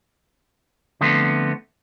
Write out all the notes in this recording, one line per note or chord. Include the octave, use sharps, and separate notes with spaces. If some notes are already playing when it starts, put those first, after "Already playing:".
D3 F3 A3 B3 C4